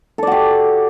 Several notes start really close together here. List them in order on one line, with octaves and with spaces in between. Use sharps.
A4 D5 F#4 G4